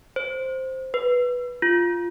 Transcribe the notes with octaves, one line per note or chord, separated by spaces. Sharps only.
C5
B4
F4